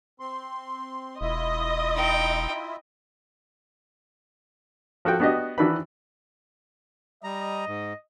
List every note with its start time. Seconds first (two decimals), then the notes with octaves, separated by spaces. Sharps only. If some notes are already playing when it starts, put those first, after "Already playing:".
0.20 C4 C6
1.21 E1 E4 F4 D#5 E5
1.95 D#4 G5
5.05 F3 F#4 A4 G5
5.20 B3 D4 F#4 G4 D#5
5.58 D#3 E3 D4 F#4 B4 B5
7.24 G3 D#5 A#5
7.68 G#2